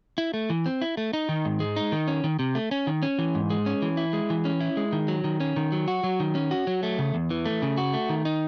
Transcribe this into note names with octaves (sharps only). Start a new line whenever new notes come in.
E4
A3
E3
C4
E4
A3
D#4
D#3
G#2
G#3
D#4
D#3
C#4
D#3
C3
A3
C#4
D#3
C#4
E3
G#2
G#3
C#4
E3
E4
G#3
E3
C#4
E4
G#3
D#3
F#3
D#3
C#4
D#3
F#3
F#4
F#3
D#3
C#4
F#4
F#3
A3
C#3
E2
E3
A3
C#3
F#4
A3
D#3
D#4